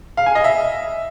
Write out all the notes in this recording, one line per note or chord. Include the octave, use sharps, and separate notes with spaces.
F5
G#5
D#5
E5